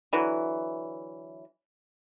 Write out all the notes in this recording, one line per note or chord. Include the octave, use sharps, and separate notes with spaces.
D3 E3 F#3